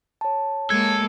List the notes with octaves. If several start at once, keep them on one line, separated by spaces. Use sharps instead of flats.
C#5 A5
G#3 A#3 A4 G#6